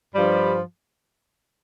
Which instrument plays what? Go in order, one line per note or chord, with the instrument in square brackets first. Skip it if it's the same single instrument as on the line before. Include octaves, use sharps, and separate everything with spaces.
[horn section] G2 F3 G3